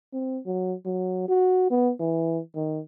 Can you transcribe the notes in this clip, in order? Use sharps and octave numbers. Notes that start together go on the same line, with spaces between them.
C4
F#3
F#3
F#4
B3
E3
D#3